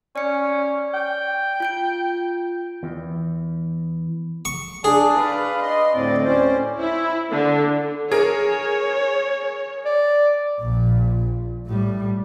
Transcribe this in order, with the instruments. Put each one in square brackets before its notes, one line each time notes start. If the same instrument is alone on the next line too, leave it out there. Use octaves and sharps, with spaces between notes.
[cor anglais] C#4 [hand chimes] D5 C#7
[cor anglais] G5
[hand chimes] F4 G6 D7
[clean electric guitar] E2
[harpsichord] C#6
[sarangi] D4 [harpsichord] G#4
[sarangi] B4 [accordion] D5 F5
[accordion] D#5 C6
[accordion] D2 A2 C4 [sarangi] D5
[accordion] C#4 C5
[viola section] E4
D3
[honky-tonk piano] G#4 A#4 [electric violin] C#5
[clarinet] D5
[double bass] A#1 A#2
A2 G3